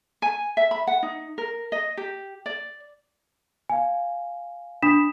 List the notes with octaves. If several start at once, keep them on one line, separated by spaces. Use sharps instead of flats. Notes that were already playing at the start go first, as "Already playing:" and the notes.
G#5
E5
B5
F#5
D#4
A#4
D#5
G4
D5
F5 G#5
D4 B5 D#6 B6 E7